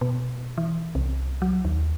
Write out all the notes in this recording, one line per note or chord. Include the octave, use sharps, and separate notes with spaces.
B2
E3
C2
F#3
D#2